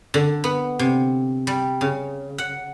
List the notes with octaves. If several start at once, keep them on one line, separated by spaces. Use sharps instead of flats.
D3
B3
C3
G3
C#3
F#5